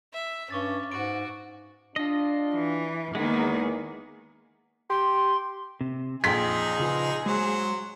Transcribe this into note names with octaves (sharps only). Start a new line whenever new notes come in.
E5
G2 C#4 C#6 D6 A6
G#2 F#4 D7
D4 F4 D#5
E3
E2 D#3 G#3 A#3 B3 G#4
G4 C6
C3
A#1 F2 F3 D#4 G#4 G5 C6 B6
C#3 F4 B4
F#3 G#3 C5